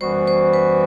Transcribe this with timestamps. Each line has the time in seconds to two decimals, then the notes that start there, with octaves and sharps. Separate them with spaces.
0.01 F#2 E3 G3 B3 F#4 C5
0.27 C5
0.54 B4